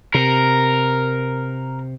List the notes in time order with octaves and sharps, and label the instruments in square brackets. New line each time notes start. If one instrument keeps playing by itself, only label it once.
[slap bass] C3 [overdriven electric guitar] A#4